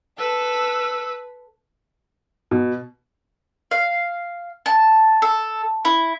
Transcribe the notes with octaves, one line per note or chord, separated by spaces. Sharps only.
A4 B4 E6
B2
F5
A5
A4
E4